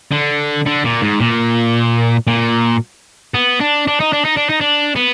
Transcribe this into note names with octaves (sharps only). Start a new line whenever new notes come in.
D3
D3
A#2
G#2
A#2
A#2
B3
D4
D4
D#4
D4
D#4
D4
D#4
D4
B3